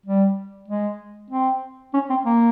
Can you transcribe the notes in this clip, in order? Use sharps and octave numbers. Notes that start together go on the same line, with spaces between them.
G3
G#3
C4
C#4
C4
A#3